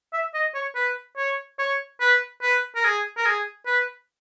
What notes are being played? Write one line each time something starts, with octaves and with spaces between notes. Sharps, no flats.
E5
D#5
C#5
B4
C#5
C#5
B4
B4
A#4
G#4
A#4
G#4
B4